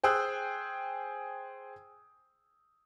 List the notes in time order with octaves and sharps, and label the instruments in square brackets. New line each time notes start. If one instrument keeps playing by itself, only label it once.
[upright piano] G#4 C5 G5 D#6 E6 F#6